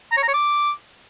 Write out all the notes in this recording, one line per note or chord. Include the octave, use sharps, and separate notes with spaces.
A#5
C#5
A#5
C#5
D6